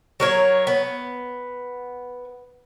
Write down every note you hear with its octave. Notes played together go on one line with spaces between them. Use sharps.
F#3 A#4 C#5
B3